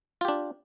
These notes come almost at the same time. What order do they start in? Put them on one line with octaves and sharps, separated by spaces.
F4 G4 D4